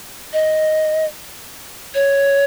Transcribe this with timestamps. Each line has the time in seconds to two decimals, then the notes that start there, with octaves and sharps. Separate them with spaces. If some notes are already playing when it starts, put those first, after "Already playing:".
0.33 D#5
1.95 C#5